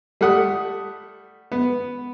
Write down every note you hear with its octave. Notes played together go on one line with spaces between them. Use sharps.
G3 A3 F#5 D#6
B3